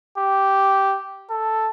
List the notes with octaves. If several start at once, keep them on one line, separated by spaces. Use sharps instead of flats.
G4
A4